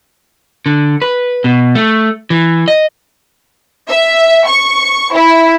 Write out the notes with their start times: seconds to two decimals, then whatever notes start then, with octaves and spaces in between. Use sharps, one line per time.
0.66 D3
1.02 B4
1.44 B2
1.75 A3
2.30 E3
2.68 D#5
3.89 E5
4.47 C#6
5.12 E4